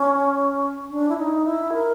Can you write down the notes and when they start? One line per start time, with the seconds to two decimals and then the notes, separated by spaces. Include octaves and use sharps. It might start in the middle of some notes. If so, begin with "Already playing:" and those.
Already playing: C#4
0.90 D4
1.09 E4
1.17 D#4
1.45 E4
1.73 A#4